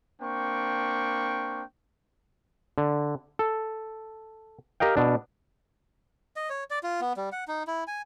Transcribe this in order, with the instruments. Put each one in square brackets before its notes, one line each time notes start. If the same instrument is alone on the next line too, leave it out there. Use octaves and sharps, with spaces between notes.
[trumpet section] A#3 C4 D4 G5 C#6
[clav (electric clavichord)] D3
A4
G4 A#4 D#5 F5 G5
B2 D4
[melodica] D#5
C#5
D5
F4
B3
G3
F#5
D#4
E4
G#5